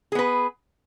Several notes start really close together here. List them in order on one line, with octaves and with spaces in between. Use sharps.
G#4 B3 B4